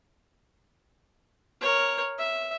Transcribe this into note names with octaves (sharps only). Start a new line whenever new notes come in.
A#4 C#5
E5